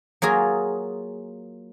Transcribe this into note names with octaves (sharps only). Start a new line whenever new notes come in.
F#3 A#3 F4 G#4